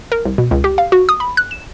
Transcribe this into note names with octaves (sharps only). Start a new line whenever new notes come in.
A#4
C2
B2
C#2
G4
F5
F#4
D#6
B5
F#6
E7